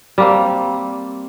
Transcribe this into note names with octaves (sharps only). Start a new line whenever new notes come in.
G3 A#3 C4